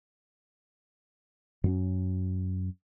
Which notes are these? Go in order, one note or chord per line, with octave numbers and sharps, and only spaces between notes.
F#2 F#3 C#4